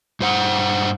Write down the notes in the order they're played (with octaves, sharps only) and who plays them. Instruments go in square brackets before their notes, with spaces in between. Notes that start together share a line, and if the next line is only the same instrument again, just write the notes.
[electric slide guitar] G2 C5 F#5